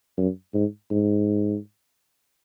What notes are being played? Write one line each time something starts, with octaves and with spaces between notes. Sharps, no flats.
F#2
G#2
G#2